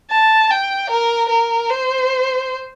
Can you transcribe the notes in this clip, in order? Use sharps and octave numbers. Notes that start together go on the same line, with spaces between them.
A5
G5
A#4
A#4
C5